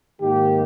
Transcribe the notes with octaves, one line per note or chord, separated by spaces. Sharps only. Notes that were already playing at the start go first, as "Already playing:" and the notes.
G#2 D#3 A#3 G4